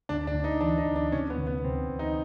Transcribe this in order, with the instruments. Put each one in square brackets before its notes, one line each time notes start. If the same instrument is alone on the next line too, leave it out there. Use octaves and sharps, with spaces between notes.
[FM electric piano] D2 [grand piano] D4
[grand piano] D4
[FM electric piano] D2
[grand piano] D#4
[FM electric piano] E3 [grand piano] D4
[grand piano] D#4
[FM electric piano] D2
[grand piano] D4
[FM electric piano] C3 [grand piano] C#4
[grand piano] B3
[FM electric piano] D2
[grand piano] B3
[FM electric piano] C3 [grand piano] C4
[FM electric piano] D2
[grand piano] D#4